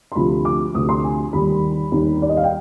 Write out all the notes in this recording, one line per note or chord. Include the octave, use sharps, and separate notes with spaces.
C6
D2 C3 F3 B5
D6
D2 C3 F3 D#6
C6
G#5
D#2 D#3 G3 B5
D#2 D#3 G3
D5
D#5
F5
G5